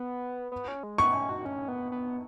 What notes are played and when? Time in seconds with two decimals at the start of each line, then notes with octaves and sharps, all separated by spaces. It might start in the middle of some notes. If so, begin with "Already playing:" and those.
Already playing: B3
0.52 B3
0.68 C#4
0.83 G#3
0.98 B3 C#6
1.14 C#4
1.29 F#4
1.45 C#4
1.68 B3
1.92 B3